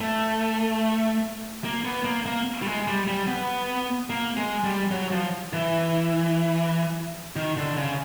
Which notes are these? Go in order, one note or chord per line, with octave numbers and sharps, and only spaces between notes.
A3
A#3
B3
A#3
A#3
G3
G#3
G3
G3
B3
A#3
G#3
G3
F#3
F3
E3
D#3
D3
C#3